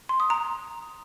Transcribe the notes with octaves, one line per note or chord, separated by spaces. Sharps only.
C6
D#6
A#5